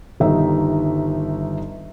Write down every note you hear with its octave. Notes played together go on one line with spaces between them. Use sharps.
G1 D#3 G3 D#4 E5